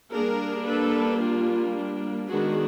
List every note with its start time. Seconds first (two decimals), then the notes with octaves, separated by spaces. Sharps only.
0.13 G3 A#3 D4 G#4 A#4
0.67 A4 B4
1.21 F4 G4
1.74 D4
2.28 D#3 G#3 B3 D4 F#4 G#4